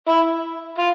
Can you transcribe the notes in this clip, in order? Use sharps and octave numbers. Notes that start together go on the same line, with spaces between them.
E4
F4